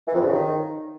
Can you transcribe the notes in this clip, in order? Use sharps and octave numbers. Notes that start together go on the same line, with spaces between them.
E3
F2
G2
C#3
D#3